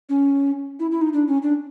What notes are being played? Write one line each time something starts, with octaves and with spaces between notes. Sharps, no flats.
C#4
E4
E4
D#4
D4
C#4
D4